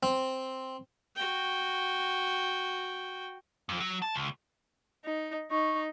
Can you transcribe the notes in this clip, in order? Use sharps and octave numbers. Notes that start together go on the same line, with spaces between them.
C4
F#4 G5
F2
F#3
A5
C#2
D#4
D#4 C#6